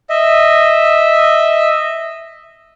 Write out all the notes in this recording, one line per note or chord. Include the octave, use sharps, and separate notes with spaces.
D#5 E5